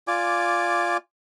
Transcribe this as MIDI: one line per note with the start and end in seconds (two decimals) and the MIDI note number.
0.07 0.97 65
0.07 0.97 74
0.07 0.97 80
0.07 0.97 86